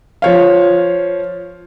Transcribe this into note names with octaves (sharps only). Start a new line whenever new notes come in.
F3 C#5 F5